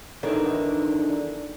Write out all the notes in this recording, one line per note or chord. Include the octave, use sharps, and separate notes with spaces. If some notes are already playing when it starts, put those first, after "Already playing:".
E2 D3 D#3